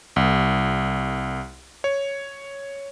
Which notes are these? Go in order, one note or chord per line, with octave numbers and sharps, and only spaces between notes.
C2
C#5